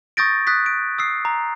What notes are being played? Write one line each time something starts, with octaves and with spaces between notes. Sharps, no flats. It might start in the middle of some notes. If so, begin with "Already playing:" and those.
C#6 D#6 G6 A6 A#6 D7
D#6 F#6 A6 B6
D7
D#6 E6 C7
A#5